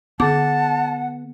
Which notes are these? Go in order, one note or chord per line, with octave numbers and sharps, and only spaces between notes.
D3 B3 F#5 A5 D6